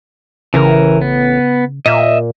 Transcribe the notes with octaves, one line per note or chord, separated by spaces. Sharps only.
A1 C#3 E3 A#4
B3
A#2 D#5 E5